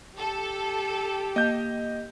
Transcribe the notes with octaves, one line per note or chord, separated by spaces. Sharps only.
G4 A4
A#3 D#5 G6